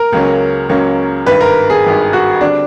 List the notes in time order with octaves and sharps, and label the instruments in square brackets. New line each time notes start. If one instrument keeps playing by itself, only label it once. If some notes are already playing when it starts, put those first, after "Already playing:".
Already playing: [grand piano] A#4
[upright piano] C#2 C#3 F#3 A#3 C#4
C#2 C#3 F#3 A#3 C#4
[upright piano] G#1 G2 D#3 [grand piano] B4
[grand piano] A#4
G#4
[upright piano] G#1 G2 D#3
[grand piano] F#4
[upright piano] D3 G3 C4 [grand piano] D4